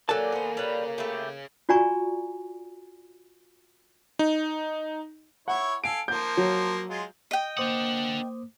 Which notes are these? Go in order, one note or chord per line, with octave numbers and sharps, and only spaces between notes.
D#2 F#3 A#3 D4 G4 A4 G#5 A5
B3 C5
G3 G#4 B4 C#5
A3 E4 G4
F4 F#4 D5 G#5 A#5 C#6
D#4
E4 C#5 F#5
A4 F5 G#5 D7
F3 A#3 G6
F#3
G#3 F4
D#5 G5
A#3 D4 C5 F#5 D6 D#6